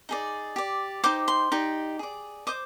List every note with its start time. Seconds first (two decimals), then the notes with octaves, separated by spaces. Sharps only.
0.09 D#4 G#4 D5
0.56 G4 D5
1.04 D#4 G4 C5 D6
1.28 C6
1.52 D#4 G4 D5
1.99 G#4 D5
2.47 C5 D#5 D6